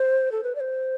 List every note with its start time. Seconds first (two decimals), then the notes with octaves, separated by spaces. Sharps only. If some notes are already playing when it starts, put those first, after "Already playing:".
Already playing: C5
0.32 A4
0.43 B4
0.55 D5
0.60 C5